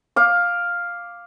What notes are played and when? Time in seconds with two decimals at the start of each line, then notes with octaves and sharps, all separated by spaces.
0.16 F5 D6